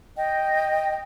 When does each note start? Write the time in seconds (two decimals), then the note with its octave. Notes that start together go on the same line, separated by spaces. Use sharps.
0.17 D#5 G5